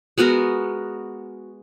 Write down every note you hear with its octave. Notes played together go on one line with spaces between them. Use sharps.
G#3 B3 F#4 A#4